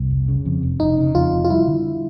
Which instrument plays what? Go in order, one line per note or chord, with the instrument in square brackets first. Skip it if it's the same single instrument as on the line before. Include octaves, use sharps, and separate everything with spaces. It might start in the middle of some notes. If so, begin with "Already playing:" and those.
Already playing: [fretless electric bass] C2
F1
C#3
F2
F1
[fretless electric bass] F1 [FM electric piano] D#4
[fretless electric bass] C#3
[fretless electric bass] F2 [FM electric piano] F4
[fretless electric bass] F1
[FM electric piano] F4
[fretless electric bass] G3 [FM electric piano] E4
[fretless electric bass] D3